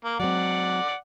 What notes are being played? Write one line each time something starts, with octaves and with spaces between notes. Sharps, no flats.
A#3
F#3 G#3 C4 D5 F#5